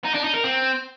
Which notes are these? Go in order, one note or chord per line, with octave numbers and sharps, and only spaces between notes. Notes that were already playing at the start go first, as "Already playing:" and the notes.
D#4
D4
D#4
A#4
C4